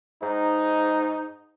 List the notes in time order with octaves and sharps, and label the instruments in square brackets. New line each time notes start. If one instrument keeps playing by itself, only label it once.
[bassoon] G#2 [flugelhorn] D#4